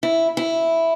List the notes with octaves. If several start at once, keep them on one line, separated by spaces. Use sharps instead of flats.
E4
E4